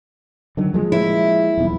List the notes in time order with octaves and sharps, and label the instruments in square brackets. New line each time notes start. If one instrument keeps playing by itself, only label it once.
[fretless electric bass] D3 D#3 F#3
F3 G#3 A#3
[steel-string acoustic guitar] E4
[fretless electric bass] D#1 B1 E2